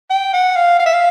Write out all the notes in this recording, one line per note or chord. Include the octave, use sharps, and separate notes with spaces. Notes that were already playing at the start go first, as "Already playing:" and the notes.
G5
F#5
F5
F5
E5
F5